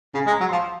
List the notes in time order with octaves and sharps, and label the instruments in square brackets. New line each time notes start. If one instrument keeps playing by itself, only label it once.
[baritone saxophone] C#3 [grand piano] G#5
[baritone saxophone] G#3
[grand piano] A#5
[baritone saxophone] F#3
[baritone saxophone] F3 [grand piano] C6